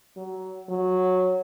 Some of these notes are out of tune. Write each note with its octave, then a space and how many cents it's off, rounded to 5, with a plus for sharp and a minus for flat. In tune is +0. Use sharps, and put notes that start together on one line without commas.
F#3 +20
F#3 -10